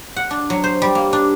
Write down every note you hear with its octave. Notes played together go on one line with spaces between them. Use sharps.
F#5
D4
F#3
C5
G3
A#3
D4